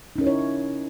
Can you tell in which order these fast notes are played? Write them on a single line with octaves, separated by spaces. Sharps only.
D#4 C#4 A#4 E4 C#5